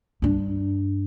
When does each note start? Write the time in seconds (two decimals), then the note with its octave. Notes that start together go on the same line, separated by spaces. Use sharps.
0.22 G2 D4